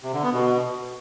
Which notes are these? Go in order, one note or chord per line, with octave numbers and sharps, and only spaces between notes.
C3
D3
B3
B2